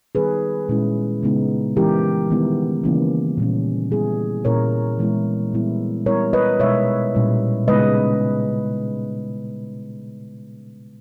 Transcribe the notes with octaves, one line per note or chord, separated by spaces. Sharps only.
D#3 G3 B3 D#4 G#4 B4
A#2 G#3 C#4 E4
C#3 G#3 B3 D#4
E3 G#3 C#4 E4 G4 A#4
D#3 G3 B3 E4
C#3 E3 A#3 C#4
A#2 G3 C#4
G3 B3 E4 G#4
A#2 A#3 C#4 E4 A#4 C#5
E3 G#3 B3 E4
A#2 G3 B3 E4
G3 B3 E4 A#4 C#5
B4 D#5
B2 G#3 D#4 C#5 E5
A#2 G3 C#4 E4
C#3 G#3 B3 D#4 B4 D#5